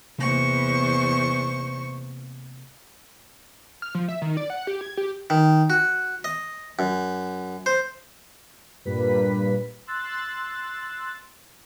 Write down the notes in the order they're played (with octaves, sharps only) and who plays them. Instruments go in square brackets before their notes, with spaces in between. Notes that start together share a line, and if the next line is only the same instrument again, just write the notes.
[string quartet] E2 C5 C#6 [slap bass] C3 A#3
[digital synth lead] F6
F3
E5
D#3
D5
F#5
G4
G#6
G4
[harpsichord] D#3
F#4
D#5
F#2
C5
[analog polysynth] G2 A#2 G3 B4 B6
C6 E6 F#6 A6